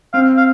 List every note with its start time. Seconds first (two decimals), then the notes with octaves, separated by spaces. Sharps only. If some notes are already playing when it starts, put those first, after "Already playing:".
0.13 C4 F5
0.37 F5